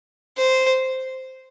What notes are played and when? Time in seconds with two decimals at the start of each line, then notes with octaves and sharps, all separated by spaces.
0.37 C5